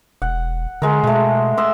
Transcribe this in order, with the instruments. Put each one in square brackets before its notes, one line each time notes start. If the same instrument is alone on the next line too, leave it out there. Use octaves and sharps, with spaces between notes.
[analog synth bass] E1 [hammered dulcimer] F#5
[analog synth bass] D3 [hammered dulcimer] G#3 A#4
[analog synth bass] B2 [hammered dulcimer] G#3 A3
[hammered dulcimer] D#5 E5 C6